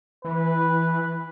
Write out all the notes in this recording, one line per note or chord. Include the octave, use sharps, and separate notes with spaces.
E3 B4